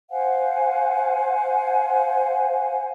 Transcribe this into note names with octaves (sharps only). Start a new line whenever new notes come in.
C5 F5 F#5 G#5